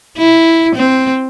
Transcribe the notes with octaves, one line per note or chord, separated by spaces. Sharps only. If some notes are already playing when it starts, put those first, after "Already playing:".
E4
C4